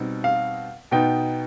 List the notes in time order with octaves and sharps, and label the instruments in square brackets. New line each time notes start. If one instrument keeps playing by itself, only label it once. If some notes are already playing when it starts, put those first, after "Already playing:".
Already playing: [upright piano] B2 G3 C4 D#4
F5
B2 B3 D#4 G5